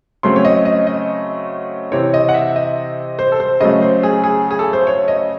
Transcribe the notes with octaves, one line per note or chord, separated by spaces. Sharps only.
C#3 F#3 A3 C4 C6
C#5
D#5
D#5
D#5
C3 E3 C4 C#5
D#5
F#5
E5
D#5
C5
A4
C5
C#3 F#3 A3 D#5
C5
G#4
G#4
G#4
A4
C5
C#5
D#5